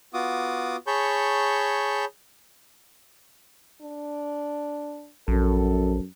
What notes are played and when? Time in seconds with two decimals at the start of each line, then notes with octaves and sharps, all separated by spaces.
0.14 B3 F4 F#4 D6 D#6
0.87 G#4 C#5 A5 B5 C#6 G6
3.82 D4
5.28 A#1 F#2 A4